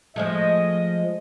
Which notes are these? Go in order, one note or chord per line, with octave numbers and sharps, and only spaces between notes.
F3 G#3 A3 D#5